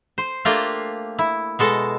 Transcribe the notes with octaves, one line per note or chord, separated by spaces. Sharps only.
C5
A3 A#3 D4 F4 G4
E4
B2 G#3 A4